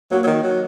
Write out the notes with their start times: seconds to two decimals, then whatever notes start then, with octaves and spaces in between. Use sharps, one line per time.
0.11 F#3 A#3 F#4 C#5
0.23 F#3
0.27 D#3
0.43 F#3